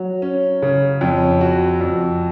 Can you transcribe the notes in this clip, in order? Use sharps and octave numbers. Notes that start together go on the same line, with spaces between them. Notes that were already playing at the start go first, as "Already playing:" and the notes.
Already playing: F#3
C#4
C#3
F2
F#4
F2